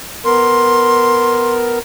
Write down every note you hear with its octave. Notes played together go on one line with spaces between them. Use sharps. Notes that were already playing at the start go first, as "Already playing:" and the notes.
B3 A#4 C6